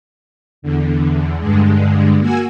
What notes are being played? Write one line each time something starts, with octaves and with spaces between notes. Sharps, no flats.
E2 D3
G2 D3 G#3
A#3 F#4 G#5 E6